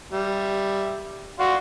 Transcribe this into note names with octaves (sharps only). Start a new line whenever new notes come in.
G3 E5
F#4 D5 F5 C6